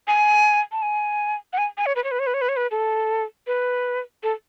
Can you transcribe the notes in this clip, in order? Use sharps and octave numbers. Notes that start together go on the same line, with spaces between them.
G#5
A5
G#5
F#5
G#5
G#5
C#5
B4
C#5
B4
C#5
B4
C#5
B4
C#5
B4
A4
B4
A4